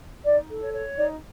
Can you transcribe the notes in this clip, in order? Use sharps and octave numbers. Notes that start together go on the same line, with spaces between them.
D#4 D5
A4
C#5
C#5
D#4 D5